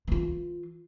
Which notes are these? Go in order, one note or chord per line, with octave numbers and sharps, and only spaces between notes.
E3 F4